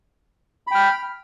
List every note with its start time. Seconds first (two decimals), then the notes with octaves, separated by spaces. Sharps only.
0.67 B5
0.71 G5
0.75 F6